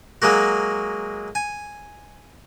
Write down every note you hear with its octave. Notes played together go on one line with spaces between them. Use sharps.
F#3 G#3 A#3 F#4
G#5